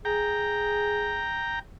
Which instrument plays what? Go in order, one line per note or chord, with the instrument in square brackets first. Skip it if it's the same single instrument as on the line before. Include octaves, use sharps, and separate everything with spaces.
[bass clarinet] G#4 [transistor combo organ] G5 A#5